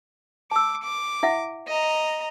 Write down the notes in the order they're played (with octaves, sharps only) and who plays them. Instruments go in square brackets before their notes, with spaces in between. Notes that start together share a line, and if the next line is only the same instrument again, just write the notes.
[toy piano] A5 E6 [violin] D6
[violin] D6
[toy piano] E4 E5 F#5
[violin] D#5 A#5